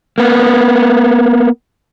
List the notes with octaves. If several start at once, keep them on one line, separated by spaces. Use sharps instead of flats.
A#3 B3